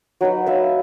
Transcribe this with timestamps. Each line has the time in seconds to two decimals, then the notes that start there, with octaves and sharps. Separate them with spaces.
0.21 F#3 D#4 B4
0.46 B4 E5 F5